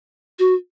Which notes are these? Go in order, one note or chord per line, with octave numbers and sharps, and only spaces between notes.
F#4